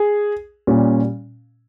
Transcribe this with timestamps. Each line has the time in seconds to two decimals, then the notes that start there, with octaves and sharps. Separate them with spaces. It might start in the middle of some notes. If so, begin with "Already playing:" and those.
Already playing: G#4
0.67 A#2 G3 C#4